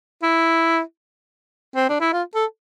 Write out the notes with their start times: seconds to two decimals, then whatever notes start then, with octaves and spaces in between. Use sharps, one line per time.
0.23 E4
1.76 C4
1.89 D4
2.00 E4
2.13 F4
2.35 A4